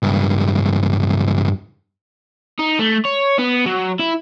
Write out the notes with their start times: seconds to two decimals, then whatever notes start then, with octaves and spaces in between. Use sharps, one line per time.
0.03 C#2 G2
2.59 D#4
2.79 A3
3.05 C#5
3.38 B3
3.66 F#3
3.99 E4